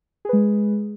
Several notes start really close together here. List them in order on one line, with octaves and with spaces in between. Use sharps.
G#4 B4 G#3